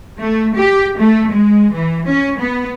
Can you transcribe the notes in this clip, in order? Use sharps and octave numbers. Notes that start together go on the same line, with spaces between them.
A3
G4
A3
G#3
E3
C#4
B3